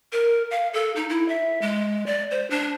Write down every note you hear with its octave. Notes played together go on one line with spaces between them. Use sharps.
A#4
F5
A4
D#4
E4
E5
G#3
D5
C5
D4